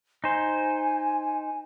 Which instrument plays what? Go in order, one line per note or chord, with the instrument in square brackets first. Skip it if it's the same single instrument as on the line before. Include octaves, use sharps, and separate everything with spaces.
[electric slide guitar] D#4 C5 [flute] G#5